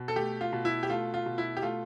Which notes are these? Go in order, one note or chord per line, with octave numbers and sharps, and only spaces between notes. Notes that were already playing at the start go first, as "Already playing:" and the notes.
Already playing: B2
A4
A3 G4
F4
B2
E4
G4
A3 F4
F4
B2
E4
G4
A3 F4